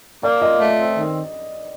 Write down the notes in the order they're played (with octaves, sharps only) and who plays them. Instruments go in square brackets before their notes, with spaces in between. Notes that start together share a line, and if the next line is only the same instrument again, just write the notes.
[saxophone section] A#3 [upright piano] D5
[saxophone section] F4 [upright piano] D#5
[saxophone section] A3
C4
D#3